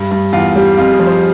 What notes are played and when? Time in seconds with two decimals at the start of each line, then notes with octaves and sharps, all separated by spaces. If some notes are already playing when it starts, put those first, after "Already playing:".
Already playing: G2
0.11 G2
0.33 E2 F4
0.56 G3
0.77 F2 F4
0.92 G#4
0.99 F3
1.07 C5